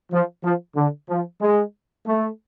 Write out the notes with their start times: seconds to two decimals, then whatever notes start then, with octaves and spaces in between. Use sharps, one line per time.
0.12 F3
0.43 F3
0.76 D3
1.09 F3
1.41 G#3
2.06 A3